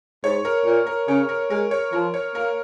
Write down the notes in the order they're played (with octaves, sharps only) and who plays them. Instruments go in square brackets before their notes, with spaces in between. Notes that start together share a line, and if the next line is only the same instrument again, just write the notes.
[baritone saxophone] G#2 [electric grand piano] C#5
[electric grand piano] A#4
[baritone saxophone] A#2
[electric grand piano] A#4
[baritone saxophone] C#3 [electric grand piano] C#5
[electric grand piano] A#4
[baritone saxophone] G#3 [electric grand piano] A#4
[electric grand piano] C#5
[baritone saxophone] F3 [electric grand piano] A#4
[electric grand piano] C#5
[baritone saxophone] A#3 [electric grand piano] A#4